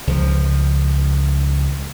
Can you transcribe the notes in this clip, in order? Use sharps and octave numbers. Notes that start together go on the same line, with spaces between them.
C#2 F3